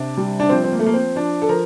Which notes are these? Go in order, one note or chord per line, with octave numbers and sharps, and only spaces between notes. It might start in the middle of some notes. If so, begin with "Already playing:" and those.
Already playing: C3 D4
G3
D4
F3 C4
C4
A#3
A3
F3 A#3
C4
F3 D4
A4
F3 A#4